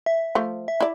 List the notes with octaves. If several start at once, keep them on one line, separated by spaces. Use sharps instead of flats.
E5
F3 A3
E5
E4 D5